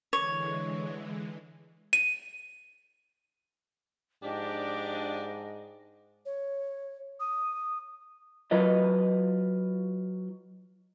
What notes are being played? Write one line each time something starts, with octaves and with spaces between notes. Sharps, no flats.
D3 E3 G#3 C#5
D#7
G#2 F3 D4 G4 D#5
C#5
D#6
F#3 F4 B4 D#5